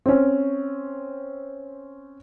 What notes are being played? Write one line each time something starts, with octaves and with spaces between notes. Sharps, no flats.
C4 C#4